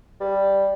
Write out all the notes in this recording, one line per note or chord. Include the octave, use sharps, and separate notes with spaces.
G3